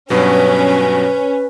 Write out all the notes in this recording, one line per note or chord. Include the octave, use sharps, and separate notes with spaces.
G2 B2 F#3 C#4 B4